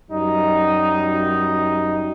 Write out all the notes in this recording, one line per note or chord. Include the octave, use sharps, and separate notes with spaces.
F#2 G3 D#4